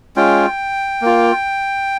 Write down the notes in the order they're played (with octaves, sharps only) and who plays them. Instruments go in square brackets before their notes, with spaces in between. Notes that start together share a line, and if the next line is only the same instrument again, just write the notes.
[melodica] G#3 C#4 F4 G5
A#3 F4